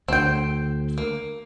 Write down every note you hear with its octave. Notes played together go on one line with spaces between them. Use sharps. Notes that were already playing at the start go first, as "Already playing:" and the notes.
D2 D3 C4 G5
A#3